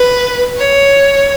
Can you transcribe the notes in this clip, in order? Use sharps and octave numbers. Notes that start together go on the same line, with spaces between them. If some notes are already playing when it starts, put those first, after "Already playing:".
Already playing: B4
C#5